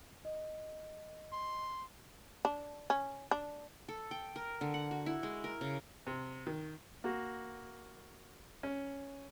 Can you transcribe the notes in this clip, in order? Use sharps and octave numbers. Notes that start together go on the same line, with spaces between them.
D#5
C6
D4
C#4
D4
A4
G5
A#4
D3
F#5
F#4
E4
G#3
A#4
C#3
C3
D#3
A#3 F#4
C#4